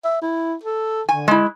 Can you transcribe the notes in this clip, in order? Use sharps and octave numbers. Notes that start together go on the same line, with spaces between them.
E5
E4
A4
D3 G#5
G#3 E4